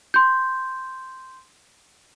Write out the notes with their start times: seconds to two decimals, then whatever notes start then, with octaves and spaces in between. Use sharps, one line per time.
0.14 C6 G6